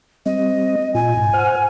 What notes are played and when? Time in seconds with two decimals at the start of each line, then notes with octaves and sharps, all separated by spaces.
0.26 G3 C4 D#5
0.95 A#2 F4 G#5
1.17 G#2
1.33 C5 F#5 F6